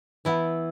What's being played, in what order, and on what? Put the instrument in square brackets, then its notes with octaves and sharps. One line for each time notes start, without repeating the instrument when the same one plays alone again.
[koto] E3 B3 E4